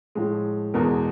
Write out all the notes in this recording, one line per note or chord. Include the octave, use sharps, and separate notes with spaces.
A2 F3 G#3
E2 B2 G#3 A#4